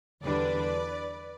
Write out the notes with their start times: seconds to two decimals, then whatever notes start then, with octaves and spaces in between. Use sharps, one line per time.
0.23 E2 D3 G3 D4 B4 D5